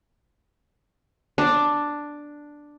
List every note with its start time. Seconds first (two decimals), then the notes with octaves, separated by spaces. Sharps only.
1.38 D4